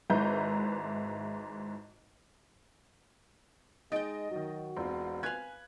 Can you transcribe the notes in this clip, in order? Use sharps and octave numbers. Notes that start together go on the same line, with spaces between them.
G#1 G#2 E4 B4 A#5 G6
G#3 D#4 D#5 G5 A6 D7
D#3 F#3 F#4
E1 C4 F4
B4 F5 G#5 F#6 G#6